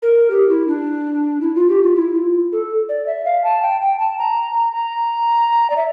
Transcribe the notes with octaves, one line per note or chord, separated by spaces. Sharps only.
A#4
G4
E4
D4
E4
F4
G4
F4
E4
F4
A4
D5
E5
F5
A5
G5
G5
A5
A#5
A#5
D5
E5